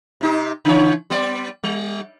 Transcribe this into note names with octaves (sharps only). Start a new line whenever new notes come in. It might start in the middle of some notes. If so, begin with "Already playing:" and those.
C3 D#4 G4
C#3 E3 C#5
G3 B3 D5
G3